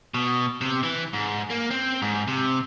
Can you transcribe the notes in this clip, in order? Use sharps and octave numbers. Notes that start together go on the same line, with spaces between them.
B2
C3
E3
G#2
A#3
C4
G#2
C3